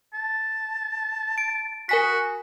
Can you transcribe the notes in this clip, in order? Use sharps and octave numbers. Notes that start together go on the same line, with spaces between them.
A5
D7
F#4 A#4 G#5 B6